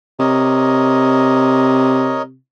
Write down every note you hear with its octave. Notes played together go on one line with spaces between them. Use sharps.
C3 A#4 C#5 D#5